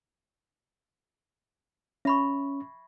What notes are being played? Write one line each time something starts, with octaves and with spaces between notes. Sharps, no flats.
C#4 E5 B5 C#6